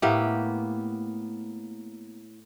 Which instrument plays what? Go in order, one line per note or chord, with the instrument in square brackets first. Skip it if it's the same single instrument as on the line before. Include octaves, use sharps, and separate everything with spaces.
[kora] A2 A#3 B3 G4